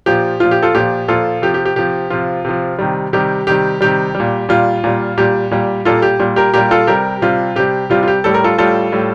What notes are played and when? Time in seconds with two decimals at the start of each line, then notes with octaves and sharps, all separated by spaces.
0.06 A#2 F3 G4
0.40 A#2 F3 F4
0.51 G4
0.62 F4 A4
0.75 A#2 F3 G4
1.08 A#2 F3 F4 A4
1.42 C3 F3 G4
1.54 G4
1.65 G4
1.76 C3 F3 G4
2.10 C3 F3 F4
2.45 C3 F3
2.79 C3 D#3 G3
3.13 C3 D#3 G3 G4
3.47 C3 D#3 G3 G4
3.81 C3 D#3 G3 G4
4.15 G3
4.20 A#2
4.49 A#2 G3 F4
4.84 A#2 G3
5.17 A#2 G3 G4
5.51 A#2 G3
5.85 A#2 G3 F4 A4
6.02 G4
6.20 A#2 G3
6.36 G4 A#4
6.54 A#2 G3 G4 A#4
6.71 F4 A4
6.87 C3 G3 G4 A#4
7.22 C3 G3 F4
7.56 C3 G3 G4
7.90 C3 G3 F4
8.03 F4
8.08 G4
8.24 A2 G3 A4
8.34 A#4
8.44 F4 A4
8.58 A2 G3 F4 A4
8.92 A2 G3